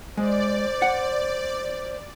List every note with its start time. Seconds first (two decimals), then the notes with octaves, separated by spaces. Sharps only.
0.17 G#3 C5 D5
0.82 F#5